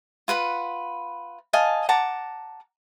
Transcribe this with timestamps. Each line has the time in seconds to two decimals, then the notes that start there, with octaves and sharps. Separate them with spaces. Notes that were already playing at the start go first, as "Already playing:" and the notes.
0.28 F4 B4 F#5 B5
1.53 D#5 F5 G#5 A5
1.89 F#5 A5 A#5 D6